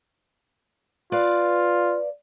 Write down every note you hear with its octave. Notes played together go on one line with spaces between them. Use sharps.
F4 B4 D5 F5